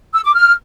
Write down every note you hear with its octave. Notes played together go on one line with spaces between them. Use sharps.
E6
D6
F6